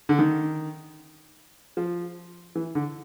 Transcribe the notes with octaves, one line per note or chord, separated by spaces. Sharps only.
D3
D#3
F3
E3
D3